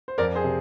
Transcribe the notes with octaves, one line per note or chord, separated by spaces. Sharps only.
C5
F2 A#4 D5
G#4 C5
C3